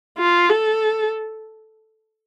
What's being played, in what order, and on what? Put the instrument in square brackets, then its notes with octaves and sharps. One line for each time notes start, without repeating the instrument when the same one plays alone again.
[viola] F4
A4